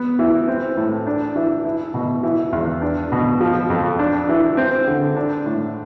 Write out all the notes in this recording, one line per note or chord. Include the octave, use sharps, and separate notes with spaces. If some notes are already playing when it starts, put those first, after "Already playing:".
Already playing: B3
E3
C4
A2
D4
E3
E4
B2
E3
E2
D4
B2
F3
F2
D4
E3
C4
D3
D4
A2